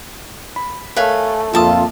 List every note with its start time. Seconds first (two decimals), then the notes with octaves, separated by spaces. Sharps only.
0.56 B5
0.96 A3 A#4 B4 C#5 F5 G#5
1.54 A#1 F2 A#3 F4 A4 E5 A5 D#6